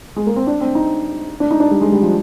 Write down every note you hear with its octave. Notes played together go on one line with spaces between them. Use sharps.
G#3
A#3
C4
D4
C4
D#4
D4
D#4
D4
G3
G#3
G3
F3